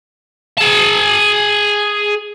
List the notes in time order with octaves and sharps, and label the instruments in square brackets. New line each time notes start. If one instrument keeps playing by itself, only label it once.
[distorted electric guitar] G#4 A5